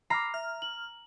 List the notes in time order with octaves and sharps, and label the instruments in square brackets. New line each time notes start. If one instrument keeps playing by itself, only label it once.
[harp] A#5 [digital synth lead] B5 [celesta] D6 F6 C7
[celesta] E5 [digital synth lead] F6
[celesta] F#7